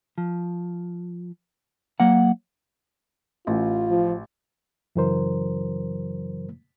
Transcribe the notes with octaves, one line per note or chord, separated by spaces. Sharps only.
F3
F#3 A#3 F#5
A1 F4
F3
F#2 C#3 E3 F#3 A#4 C5